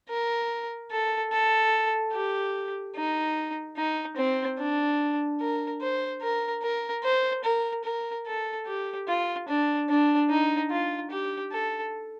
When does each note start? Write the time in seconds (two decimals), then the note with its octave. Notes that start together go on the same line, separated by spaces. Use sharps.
0.09 A#4
0.91 A4
1.32 A4
2.13 G4
2.95 D#4
3.77 D#4
4.17 C4
4.58 D4
5.41 A#4
5.81 C5
6.22 A#4
6.63 A#4
7.04 C5
7.44 A#4
7.85 A#4
8.26 A4
8.67 G4
9.08 F4
9.48 D4
9.89 D4
10.30 D#4
10.71 F4
11.11 G4
11.52 A4